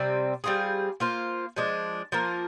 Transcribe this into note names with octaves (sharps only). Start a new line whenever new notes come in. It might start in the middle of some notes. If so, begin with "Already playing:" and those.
Already playing: C3 G3 C4
G3 C4 F4 G#4
A#3 F4 C5
F3 G#3 D4
F3 A#3 F4 A#4